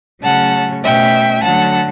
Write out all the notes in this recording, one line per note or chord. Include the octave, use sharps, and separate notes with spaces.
C#3 F#3 A3 C#4 F#5 A5
B2 A3 C#4 E5 G5
D3 F#3 A3 F#5 A5